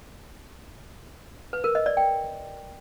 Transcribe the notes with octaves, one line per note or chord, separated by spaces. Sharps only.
B4
A#4
D#5
D5
G5